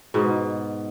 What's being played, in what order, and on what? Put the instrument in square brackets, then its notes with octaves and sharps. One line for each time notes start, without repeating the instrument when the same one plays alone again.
[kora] G#2 B2